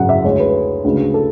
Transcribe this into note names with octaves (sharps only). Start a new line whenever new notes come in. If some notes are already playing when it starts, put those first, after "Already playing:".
Already playing: G#1 F#2 C#3 F#5
E5
D2 D3 G#3 C#5
B4
D2 C#3 G#3
A4